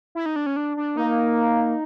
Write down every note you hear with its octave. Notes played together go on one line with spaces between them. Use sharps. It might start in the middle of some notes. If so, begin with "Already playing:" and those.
E4
D#4
D4
C#4
D4
D4
A#3 D#4